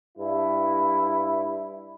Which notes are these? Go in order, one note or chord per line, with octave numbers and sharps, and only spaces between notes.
G2 E4